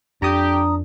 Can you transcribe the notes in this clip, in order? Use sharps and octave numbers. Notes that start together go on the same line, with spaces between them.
F2 D4 G4 A#5 D#6